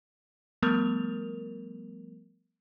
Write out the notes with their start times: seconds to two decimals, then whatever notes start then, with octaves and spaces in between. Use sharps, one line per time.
0.62 F3 G3 A3 B3 A#4 F7